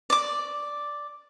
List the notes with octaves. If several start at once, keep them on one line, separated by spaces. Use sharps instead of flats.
D5 D6